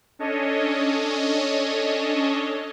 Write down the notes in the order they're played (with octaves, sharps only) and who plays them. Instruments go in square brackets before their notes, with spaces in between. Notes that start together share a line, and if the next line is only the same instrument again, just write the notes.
[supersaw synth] C#4 D4 A4 C#5 D#5